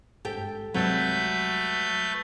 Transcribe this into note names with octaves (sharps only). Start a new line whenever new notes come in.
G#1 G2 G4 A4 G5
C#2 C3 F#3 G3 A3 C4 B4 G6